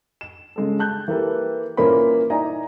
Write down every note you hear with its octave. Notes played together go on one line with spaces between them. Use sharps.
E7
C#3 G#3 A4
A5 F#6 G6
E3 A#3 G4 A4 B4
A#2 E3 A#3 C#4 C5 B5
D#4 E4 D5 G#5 A#5